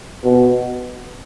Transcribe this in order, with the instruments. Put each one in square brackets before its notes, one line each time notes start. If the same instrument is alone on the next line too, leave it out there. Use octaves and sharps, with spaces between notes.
[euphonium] B2